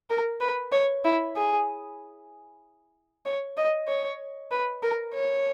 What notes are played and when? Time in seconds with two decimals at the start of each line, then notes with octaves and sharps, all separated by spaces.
0.10 A#4
0.41 B4
0.72 C#5
1.04 E4
1.36 G#4
3.26 C#5
3.57 D#5
3.88 C#5
4.51 B4
4.83 A#4
5.15 C#5